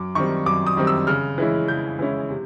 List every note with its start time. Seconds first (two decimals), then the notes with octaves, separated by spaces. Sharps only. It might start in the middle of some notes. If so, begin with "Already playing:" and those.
Already playing: F#2 D6
0.15 D#3 G3 C4 C#6
0.46 F#2 D6
0.67 D#6
0.77 D#3 G3 C4
0.87 E6
1.07 C#3 F6
1.38 E3 G#3 C#4 E4
1.68 C#3 G6
1.99 E3 G#3 C#4 E4
2.30 C3